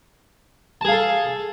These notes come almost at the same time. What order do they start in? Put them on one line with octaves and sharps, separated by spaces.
A5 G#4 F5 A4